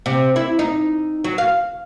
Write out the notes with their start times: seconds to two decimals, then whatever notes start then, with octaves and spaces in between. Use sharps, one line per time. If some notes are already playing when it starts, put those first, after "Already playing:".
0.06 C3
0.36 E4
0.59 D#4
1.24 F#3
1.38 F5